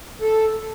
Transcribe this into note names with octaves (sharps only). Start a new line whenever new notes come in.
A4